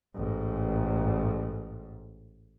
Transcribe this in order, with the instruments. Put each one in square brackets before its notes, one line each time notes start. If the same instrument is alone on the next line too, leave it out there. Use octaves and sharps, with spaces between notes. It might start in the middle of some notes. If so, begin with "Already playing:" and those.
[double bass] A1 G#2